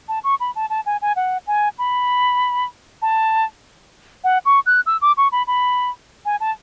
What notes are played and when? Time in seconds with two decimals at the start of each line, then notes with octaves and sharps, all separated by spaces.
0.08 A5
0.24 C#6
0.40 B5
0.55 A5
0.70 A5
0.86 G#5
1.02 G#5
1.16 F#5
1.47 G#5
1.78 B5
3.02 A5
4.24 F#5
4.45 C#6
4.66 F#6
4.86 E6
5.01 D6
5.17 C#6
5.32 B5
5.47 B5
6.25 G#5
6.40 A5